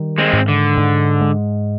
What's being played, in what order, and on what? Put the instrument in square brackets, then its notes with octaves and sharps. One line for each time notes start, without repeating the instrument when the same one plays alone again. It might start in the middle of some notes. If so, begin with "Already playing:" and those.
Already playing: [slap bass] D#3 G3
[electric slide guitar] G#3 C4
[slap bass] G#2
[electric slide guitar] D3
[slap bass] G#2
G#3